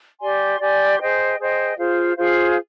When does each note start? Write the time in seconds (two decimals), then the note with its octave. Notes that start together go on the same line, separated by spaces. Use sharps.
0.19 G4 D5 G#5 C6
0.59 G4 D5 G#5 C6
0.99 G#4 C5 D#5 G5
1.38 G#4 C5 D#5 G5
1.77 F4 G#4 C5 F5
2.16 F4 G#4 C5 F5